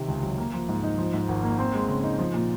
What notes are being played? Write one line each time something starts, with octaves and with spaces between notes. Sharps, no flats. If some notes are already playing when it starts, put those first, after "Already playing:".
Already playing: C3 D#3
C#2
F#3
A#3
F3
G#2
D#4
F3
G#2
G#1
A#3
C4
G#3
C#3
D#4
F3
A#2